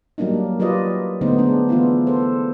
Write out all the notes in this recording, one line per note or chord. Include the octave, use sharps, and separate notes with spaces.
F#3 G3 A#3 D4 D#4
F#3 F4 G4 B4 D5 D#5
D3 A3 B3 D#4 C5
G#3 D4
E3 B3 D4 E4 F4
A4 C5